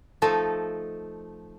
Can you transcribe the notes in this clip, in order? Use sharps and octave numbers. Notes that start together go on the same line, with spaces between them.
F3 A3 D#4 A4